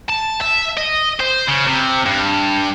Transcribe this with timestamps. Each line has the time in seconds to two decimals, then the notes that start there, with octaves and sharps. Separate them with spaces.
0.09 A5
0.41 E5
0.77 D#5
1.21 C5
1.49 C#3
1.67 C3
2.06 G2